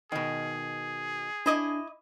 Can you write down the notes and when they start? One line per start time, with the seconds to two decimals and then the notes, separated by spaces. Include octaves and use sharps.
0.12 B2 D#3 G#4
1.46 D4 E4 D#5 D6